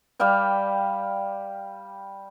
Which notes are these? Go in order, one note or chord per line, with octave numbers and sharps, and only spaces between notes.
G3 D5 F5 G5